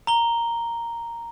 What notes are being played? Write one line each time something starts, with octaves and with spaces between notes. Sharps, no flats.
A#5 G7